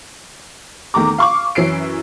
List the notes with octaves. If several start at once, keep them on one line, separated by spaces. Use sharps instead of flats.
E2 D#3 A3 A#5 D6
F5 C#6 D6
F#2 E3 C#4 C7 D7